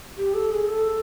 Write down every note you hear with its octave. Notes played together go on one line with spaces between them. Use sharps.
G4
A4
G#4
A4